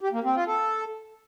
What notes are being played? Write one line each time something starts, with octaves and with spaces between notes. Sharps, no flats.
G4
A#3
C4
F4
A4